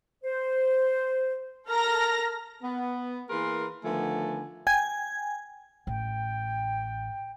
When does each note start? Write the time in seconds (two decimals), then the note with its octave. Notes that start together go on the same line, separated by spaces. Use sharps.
0.24 C5
1.69 A4 A#4 A#5 F6 A#6
2.62 B3
3.29 E3 A#3 G#4 A#4 B4 C6
3.84 D3 D#3 F3 A3 B3 G#5
4.67 G5 G#5 G#6
5.87 A1 G5